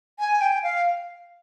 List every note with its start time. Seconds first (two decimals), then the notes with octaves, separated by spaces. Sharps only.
0.19 G#5
0.41 G5
0.63 F5